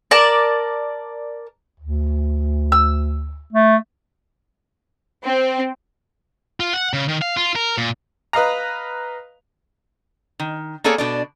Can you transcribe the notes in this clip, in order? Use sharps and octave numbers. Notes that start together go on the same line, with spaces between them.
A#4 D5 A5
D2
E6
A3
C4
F4
F#5
C#3
D#3
F5
F4
A#4
A#2
B4 D#5 F5 A#5
D#3
A#3 B3 G#4 A4 C#5 D5
B2 D4 D5